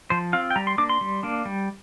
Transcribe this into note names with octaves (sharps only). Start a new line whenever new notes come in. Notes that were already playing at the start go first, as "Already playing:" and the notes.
F3 C5
C4 F4 F5
G5
G3 A#5
C6
A#3 D4 D6
C6
G3
A#3 D4
G3